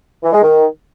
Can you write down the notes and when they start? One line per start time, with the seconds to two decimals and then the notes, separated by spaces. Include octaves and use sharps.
0.23 E3
0.33 G#3
0.42 D#3